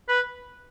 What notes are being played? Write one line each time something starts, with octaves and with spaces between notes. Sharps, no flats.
B4